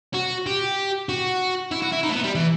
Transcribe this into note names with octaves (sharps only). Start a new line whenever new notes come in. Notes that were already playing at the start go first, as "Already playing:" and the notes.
F#4
G4
F#4
E4
F#4
E4
D#4
A3
B3
G3
E3